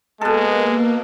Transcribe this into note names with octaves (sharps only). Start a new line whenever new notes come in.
B2 G#3 A#3 A4